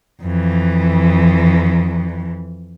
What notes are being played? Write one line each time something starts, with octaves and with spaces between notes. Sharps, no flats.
F2 E3